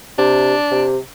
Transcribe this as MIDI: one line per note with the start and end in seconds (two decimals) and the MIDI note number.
0.18 0.54 48
0.18 0.86 62
0.71 0.97 48